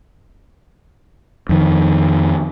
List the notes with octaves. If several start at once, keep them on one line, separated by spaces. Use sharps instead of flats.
F2 D#3